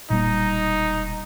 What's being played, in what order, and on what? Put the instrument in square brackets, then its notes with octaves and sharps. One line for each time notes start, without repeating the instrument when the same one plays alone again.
[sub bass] E1 [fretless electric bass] A#2 G3 A#3 [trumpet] D#4